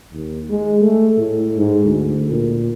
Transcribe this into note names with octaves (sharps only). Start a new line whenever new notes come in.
D#2
G#3
A3
A2
G#2
D2
A#2